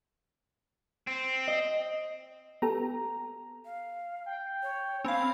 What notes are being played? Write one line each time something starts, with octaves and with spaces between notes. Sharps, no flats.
C4
D#5
B3 G4 A4 A#5
F5
G5
C#5
C4 F5 G#5 B5